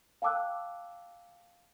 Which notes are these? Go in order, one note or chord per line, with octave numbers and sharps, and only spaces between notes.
F5 G5 A5 D6 E6 F#6